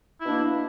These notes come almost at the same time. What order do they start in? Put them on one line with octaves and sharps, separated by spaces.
E4 B2 D4 A#3